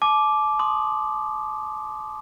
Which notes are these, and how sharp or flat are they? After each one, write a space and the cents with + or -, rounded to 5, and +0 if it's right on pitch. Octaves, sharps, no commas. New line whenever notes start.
A5 -40 D6 +0
C6 +0 D#6 -15